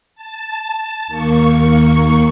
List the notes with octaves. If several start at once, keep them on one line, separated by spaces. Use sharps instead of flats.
A5
D#2 A#3 C#6